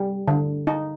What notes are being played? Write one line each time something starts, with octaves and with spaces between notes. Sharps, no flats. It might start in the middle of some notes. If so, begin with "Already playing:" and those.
Already playing: G3
D3
D#4